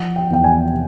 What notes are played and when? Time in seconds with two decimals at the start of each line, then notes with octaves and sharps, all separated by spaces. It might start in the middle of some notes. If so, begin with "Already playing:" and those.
Already playing: F3 F#5
0.16 G5
0.30 E2 G5
0.44 G#5
0.73 C3